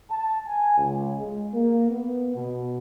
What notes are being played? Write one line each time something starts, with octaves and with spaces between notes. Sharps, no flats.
A5
G#5
C#2
G#3
A#3
B3
B2